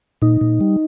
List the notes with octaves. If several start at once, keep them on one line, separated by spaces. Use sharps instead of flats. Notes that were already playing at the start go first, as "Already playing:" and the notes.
A#2 D#4
A#2
G3